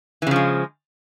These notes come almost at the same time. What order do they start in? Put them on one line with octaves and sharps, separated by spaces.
E3 C#3 F3 G#3